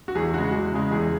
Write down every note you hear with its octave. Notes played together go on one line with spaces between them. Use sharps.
F#4
E2 G#4
C#3 G#3 F#4
E2
C#3 G#3
E2 G#4